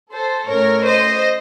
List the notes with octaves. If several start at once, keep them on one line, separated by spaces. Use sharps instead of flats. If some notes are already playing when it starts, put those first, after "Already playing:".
A4 C5
A2 A3 C#4 A#4 C#5
C5 D#5